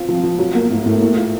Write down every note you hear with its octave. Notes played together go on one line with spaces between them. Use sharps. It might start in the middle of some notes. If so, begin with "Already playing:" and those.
Already playing: C4 F4
F3
F3
F#3
A#3
A2
A2
A#3
F4